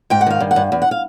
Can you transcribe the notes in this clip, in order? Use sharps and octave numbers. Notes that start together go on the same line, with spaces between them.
G#2 G5
F#5
D#3 F5
G2
F#5
G2
E2
F#5
F5